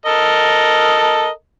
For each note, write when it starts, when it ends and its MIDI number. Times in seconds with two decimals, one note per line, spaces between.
0.06 1.29 69
0.06 1.29 70
0.06 1.29 75